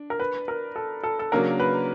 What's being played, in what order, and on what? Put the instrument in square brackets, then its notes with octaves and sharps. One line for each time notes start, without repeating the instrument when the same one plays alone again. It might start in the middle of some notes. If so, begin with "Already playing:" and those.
Already playing: [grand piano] D4
[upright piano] A#4
B4
A#4
A4
A4
A4
[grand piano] C#3 F#3 A#3 D4 F#4 [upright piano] A#4
[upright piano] B4